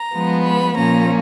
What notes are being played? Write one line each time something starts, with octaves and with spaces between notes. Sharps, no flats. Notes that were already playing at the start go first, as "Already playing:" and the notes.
Already playing: A#5
F3 G#3 B3
B5
A#2 F3 A#3 C#4 A#5